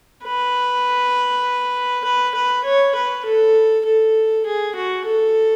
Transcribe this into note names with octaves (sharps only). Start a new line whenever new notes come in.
B4
B4
B4
C#5
B4
A4
A4
G#4
F#4
A4